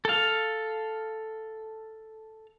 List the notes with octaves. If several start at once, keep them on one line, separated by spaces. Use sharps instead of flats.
A4 F5